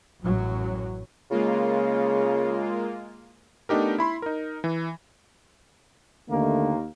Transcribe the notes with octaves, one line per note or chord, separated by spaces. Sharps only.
A1 F#2 F#3
C#3 G#3 A#3 F4
A3 B3 D4 D#4 G4 A#4
E4 B5 C6
D#4 A#4
E3
D#2 D3 D#3 A3 A#3